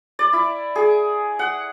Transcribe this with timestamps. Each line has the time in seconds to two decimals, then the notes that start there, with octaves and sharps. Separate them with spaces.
0.19 D5
0.33 E4
0.75 G#4
1.39 F#5